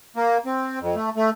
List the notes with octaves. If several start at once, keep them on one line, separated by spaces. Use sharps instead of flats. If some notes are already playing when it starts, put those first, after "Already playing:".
A#3
C4
F2
A3
A3